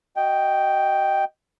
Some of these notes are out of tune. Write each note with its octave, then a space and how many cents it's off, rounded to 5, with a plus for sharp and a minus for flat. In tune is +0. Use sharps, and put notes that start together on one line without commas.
F#4 +25 D#5 +0 G5 +0